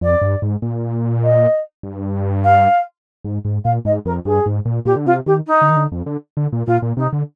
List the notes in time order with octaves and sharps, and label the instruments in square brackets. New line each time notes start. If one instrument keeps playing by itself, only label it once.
[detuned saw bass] F2 [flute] D5
[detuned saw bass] G2
G#2
A#2
[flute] D#5
[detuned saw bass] G2
[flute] F5
[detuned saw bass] G#2
G#2
[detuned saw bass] A#2 [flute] F5
[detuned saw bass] G#2 [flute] D#5
[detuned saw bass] F2 [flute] A#4
[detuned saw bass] G2 [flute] G#4
[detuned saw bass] G#2
A#2
[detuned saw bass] A#2 [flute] G4
[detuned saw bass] D3
[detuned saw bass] C3 [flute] F4
[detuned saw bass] D#3 [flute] G4
[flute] D#4
[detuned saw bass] D3
D#3
D3
F2
D3
D3
A#2
[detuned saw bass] A#2 [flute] F4
[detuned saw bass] A#2
[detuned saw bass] C3 [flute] D#4
[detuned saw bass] D3